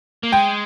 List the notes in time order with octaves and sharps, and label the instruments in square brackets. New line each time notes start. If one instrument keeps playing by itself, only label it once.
[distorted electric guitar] A#3
[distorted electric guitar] G#3 [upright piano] G5